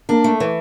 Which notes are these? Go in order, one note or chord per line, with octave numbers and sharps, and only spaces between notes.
A#3 D4
A3
E3